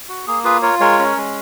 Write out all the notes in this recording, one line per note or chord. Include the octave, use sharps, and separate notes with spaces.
F#4
A#3 G#4
F4 G#4 B4
F4 A#4 C#5
G#3 A#4 C#5
C#4
G#3